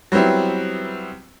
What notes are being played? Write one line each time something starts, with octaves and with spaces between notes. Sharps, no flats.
F#3 G3 B3 C4 E4